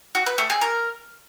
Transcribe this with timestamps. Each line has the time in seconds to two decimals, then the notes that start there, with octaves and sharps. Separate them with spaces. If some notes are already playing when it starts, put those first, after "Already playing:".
0.15 F#4
0.26 B4
0.38 A3
0.50 G#4
0.61 A#4